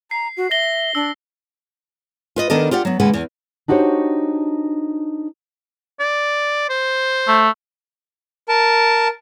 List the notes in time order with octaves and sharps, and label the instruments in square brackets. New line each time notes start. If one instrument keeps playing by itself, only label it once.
[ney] A#5 [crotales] C7
[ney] F#4
[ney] E5 [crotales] A#6 G7
[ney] D4 [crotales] E6
[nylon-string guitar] F4 B4 D#5
D#3 B3 D4 A4 A#4 D#5
F4 G4 D5 F#5
F#3 B3
D#2 C#3 G#3 B4 F#5
E2
D4 D#4 F#4 G4 C5 C#5
[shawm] D5
C5
[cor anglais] A3
[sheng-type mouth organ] A#4 A5